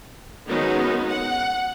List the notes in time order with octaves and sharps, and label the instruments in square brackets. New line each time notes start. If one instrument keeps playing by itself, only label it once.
[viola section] D#3 F#3 G#3 B3 C#4 D#4
F#5